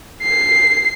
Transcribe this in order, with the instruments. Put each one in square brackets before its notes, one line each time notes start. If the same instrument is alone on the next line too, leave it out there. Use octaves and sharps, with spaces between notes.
[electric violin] C7